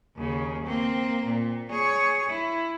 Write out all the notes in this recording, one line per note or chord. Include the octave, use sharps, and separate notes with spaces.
D#2 C#3
A#3 C4
A#2
G#4 C#5
E4